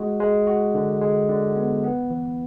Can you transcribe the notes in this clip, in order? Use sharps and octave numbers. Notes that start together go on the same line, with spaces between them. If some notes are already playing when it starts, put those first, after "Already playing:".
Already playing: G#3 F#4
G#3
F#4
D3
G#3
D3
B3
B3
E3